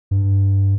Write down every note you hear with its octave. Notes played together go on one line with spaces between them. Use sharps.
G2